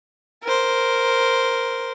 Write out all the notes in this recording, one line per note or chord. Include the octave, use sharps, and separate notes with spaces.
A#4 C5